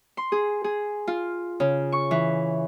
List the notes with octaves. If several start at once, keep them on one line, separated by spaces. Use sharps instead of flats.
C6
G#4
G#4
F4
C#3
C#6
E3